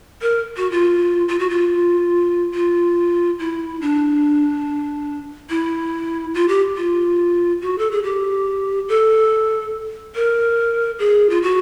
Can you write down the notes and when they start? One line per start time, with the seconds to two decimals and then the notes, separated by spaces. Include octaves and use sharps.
0.22 A#4
0.57 F#4
0.72 F4
1.28 F4
1.39 F#4
1.50 F4
2.54 F4
3.39 E4
3.81 D4
5.50 E4
6.34 F4
6.48 G4
6.77 F4
7.61 F#4
7.78 A4
7.92 G#4
8.03 G4
8.89 A4
10.15 A#4
10.99 G#4
11.30 F4
11.42 F#4